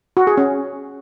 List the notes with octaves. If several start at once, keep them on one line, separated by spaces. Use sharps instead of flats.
F#4
G#4
C#4